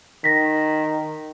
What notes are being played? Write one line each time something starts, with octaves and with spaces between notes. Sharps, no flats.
D#3 A#6 B6